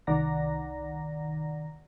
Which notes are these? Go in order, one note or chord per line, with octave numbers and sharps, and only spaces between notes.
C2 D#3 D5 F#5 A#5 A#6